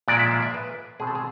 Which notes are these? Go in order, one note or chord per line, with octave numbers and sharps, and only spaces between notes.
A#2 F3 G#3 D5
E5
F5
E5
B4
B2 G#3 C4 G#4
A4
G#4